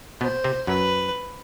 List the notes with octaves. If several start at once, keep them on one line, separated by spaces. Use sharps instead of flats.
B2 B3 C5
C3 C4
F#2 F#3 B4